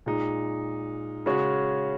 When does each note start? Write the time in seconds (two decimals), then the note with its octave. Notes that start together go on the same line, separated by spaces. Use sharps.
0.06 A#2 G#3 D#4
1.26 C#3 G#3 C#4 F#4 C#5